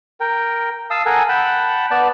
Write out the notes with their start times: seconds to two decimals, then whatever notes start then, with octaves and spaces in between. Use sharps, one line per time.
0.20 A#4 G5
0.91 F5 A5 D#6 E6
1.06 A4 A#4 F#5 G#5
1.29 F#5 G5 A5 B5
1.91 B3 D5 A5